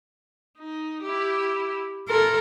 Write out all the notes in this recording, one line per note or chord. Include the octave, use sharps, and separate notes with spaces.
D#4
E4 G4
E4 A4 A#4 C6